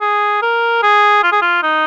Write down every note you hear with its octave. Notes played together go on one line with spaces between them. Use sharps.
G#4
A#4
G#4
F4
G#4
F4
D#4